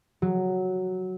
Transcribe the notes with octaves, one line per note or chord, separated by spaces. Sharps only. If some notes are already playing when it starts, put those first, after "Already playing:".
F#3